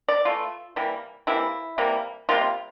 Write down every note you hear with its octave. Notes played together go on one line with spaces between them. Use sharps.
D5
E3 A3 F4
C3 E3 G3 A#3
C3 E3 G3 A#3 E4
C3 E3 G3 A#3
C3 E3 G3 A#3 F4